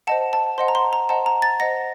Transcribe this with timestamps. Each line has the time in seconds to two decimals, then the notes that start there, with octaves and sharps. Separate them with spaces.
0.07 C5 D#5 F#5 A5
0.33 A5
0.58 C5 D#5 F#5 C6
0.68 A#5
0.75 C6
0.93 A#5
1.09 C5 D#5 F#5 A5
1.26 A#5
1.42 A6
1.60 C5 D#5 F#5 A#6